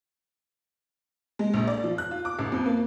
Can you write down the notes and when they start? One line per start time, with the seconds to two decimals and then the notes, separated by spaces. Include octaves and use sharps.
1.39 G#3
1.54 A#1
1.68 D5
1.84 F3
1.98 F#6
2.11 F4
2.25 D6
2.39 A1
2.52 F2
2.66 A#3